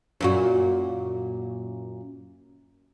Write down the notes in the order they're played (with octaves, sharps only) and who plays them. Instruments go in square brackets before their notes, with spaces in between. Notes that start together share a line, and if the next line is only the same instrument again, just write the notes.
[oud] F#2 A#2 F#4